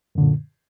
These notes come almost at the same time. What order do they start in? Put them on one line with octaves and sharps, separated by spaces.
F#2 D3 A#2